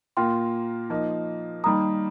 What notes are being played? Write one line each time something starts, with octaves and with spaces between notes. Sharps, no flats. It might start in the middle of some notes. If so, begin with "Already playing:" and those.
A#2 A#3 F4 G5 C6
F3 A#3 D#4
D#3 G3 A#3 D#4 A#5 D#6